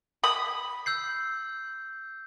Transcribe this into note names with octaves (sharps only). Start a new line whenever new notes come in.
B5 D#6
E6 G6 C7